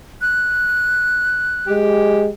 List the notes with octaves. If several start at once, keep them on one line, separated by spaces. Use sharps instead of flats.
F#6
G#3 G4